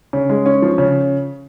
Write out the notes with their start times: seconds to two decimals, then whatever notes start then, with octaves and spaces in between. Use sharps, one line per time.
0.13 C#3
0.30 G#3
0.46 C#4
0.62 F3
0.78 C#3